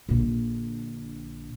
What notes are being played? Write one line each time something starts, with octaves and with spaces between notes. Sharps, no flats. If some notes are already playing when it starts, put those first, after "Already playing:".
A#1 D3